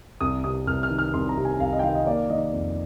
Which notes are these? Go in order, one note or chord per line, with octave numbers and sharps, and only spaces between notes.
C2 D#6
C3 D#6
C2 F6
F6
D#3
F6
C2 C6
A#5
C3
G#5
C2 F5
D#5
G5
D#3 F5
D#5
A#3 D5
D#3 D#5
F2